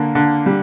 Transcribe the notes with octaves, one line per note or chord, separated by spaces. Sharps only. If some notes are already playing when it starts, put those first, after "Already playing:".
Already playing: D3 A#3
D3
G3